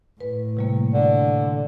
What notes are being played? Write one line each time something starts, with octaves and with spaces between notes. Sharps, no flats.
A2 B4
C3 G3 A#3
D3